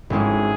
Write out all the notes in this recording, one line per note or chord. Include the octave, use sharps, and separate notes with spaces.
G#1 G#2 G#3 C#4 E4 G#4